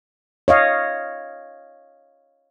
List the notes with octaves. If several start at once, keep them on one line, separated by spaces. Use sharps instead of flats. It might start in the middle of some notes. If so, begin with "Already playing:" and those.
C#5 D#5 F5